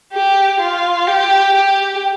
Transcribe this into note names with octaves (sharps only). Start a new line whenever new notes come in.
G4
F4
G4
G4